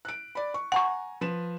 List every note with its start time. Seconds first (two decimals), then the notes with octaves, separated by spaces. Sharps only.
0.05 F#6 D7
0.35 D5 B5
0.54 C#6
0.72 F#5 G#5 A#5 C#6
1.21 F3 B4 E7